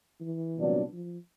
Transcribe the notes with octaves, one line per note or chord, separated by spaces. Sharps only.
E3
C2 A#2 F#3 B3 D4
F3